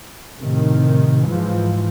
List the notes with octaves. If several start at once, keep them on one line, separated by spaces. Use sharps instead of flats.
A2 C3 D#3
G#2 E3 F3